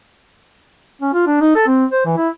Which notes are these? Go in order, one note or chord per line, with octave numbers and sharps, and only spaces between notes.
C#4
F4
D4
D#4
A4
C4
C5
E3
E4